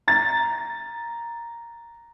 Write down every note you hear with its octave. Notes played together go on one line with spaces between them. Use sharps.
A#5 A6